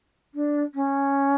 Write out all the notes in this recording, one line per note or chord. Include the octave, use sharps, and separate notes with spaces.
D4
C#4